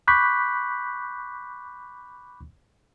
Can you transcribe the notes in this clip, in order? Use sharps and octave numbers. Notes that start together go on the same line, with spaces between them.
B5 C#6 D6 F#6 G6 B6